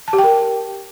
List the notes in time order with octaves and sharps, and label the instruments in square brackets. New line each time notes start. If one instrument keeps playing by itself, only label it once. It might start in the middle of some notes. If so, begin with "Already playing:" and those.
[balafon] A5
G4
G5
A#4